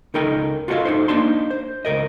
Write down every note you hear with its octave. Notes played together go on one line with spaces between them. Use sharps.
C#2 D#4 A4 A#4 D#5 G5
F4 F#4 A4 C5 D#5 F5
D#4 A4 C5
A#3 D4 D#4 A5 C6
C5
C#2 F#2 A#4 D#5